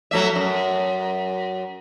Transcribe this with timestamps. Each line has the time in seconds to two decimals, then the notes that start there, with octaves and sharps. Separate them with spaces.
0.11 F#3 A3 E5
0.36 F#2